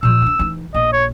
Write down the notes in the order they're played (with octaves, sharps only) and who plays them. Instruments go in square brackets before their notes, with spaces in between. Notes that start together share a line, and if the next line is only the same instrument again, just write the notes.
[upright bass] A#2 F3 [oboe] E6
[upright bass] D4 F4
E3 D#4
[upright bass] A#1 [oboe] D#5
[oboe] C#5